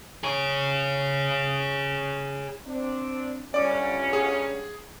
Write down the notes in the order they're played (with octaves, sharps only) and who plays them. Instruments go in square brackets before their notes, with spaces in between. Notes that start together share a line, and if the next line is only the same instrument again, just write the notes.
[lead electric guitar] G#4 C#5
[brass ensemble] C4 D4
[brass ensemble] G1 C#4 [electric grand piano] D5 D6
[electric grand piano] G#4